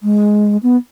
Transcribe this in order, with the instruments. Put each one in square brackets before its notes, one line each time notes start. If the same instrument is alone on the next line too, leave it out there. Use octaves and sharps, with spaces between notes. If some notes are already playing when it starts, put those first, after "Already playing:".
[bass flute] G#3
B3